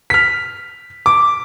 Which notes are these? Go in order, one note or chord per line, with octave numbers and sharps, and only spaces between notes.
F6 B6
D6